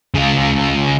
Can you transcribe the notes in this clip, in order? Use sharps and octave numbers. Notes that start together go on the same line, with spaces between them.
C#3 F4